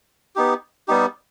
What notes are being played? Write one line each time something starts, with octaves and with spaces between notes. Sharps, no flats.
B3 D#4 G4
G3 B3 D#4 G4